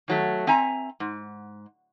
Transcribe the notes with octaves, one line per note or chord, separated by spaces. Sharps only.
D#3 F#3 A3
C4 E5 G#5 A#5
G#2